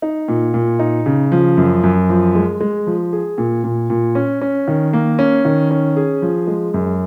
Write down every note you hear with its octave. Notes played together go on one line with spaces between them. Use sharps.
D#4
A#2
A#2
D#4
C#3
F3
F#2
F#2
F3
G#3
G#3
F3
G#4
A#2
A#2
A#2
C#4
C#4
D#3
A#3
C#4
D#3
C#4
G#4
F3
G#3
F#2